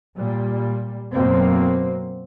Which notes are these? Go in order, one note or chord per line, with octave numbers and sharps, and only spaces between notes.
A#2 G3
F#2 B2 A#3 C4